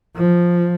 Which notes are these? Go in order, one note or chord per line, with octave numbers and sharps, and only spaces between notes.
F3